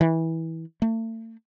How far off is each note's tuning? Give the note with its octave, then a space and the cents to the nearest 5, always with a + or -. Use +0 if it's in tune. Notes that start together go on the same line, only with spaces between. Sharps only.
E3 -20
A3 +40